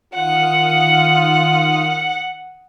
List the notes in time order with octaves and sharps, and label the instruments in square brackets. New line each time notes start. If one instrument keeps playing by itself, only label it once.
[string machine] D#3 D#6 F6 [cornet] F4 [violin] F#5